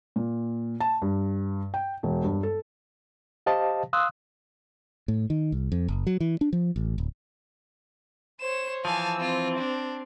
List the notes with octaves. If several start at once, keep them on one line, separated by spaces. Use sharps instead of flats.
A#2
A5
G2
G5
E1
G2
A4
G4 C5 D#5 F5 A5
F5 C6 D#6 E6 F#6
A2
D#3
C2
F2
F#1
F#3
E3
D4
F3
A1
D1
C5 C#5 E7
E3 F3 F5 G#5 A5 E6
C4 F4
D4